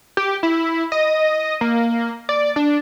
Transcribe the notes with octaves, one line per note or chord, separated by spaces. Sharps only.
G4
E4
D#5
A#3
D5
D4